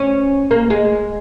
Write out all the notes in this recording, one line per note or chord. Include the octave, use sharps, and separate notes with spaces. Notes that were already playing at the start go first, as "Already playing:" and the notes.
Already playing: C#4
A#3
G#3